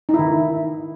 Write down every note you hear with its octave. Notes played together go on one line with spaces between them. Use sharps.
D#4
E4
D#3